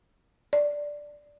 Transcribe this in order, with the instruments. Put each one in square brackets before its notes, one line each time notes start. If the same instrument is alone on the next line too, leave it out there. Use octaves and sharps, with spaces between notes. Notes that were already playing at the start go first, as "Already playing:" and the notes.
[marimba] D5